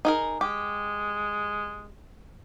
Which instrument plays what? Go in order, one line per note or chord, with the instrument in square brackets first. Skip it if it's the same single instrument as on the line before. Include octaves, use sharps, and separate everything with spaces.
[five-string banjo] D#4 G#4 A#4
[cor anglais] G#3 [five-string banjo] G4